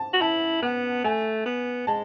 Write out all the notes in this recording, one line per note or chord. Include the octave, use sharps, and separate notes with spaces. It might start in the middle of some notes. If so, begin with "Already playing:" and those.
Already playing: A5
F#4
E4 A5
B3 F#5
A3 G#5
B3
G#3 A5